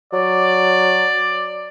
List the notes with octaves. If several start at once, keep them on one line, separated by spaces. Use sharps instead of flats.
F#3 D5